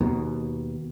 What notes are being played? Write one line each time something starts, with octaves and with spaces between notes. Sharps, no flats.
D#2 B2